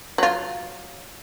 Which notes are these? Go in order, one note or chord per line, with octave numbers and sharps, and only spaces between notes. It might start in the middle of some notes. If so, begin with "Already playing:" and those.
F#3 F4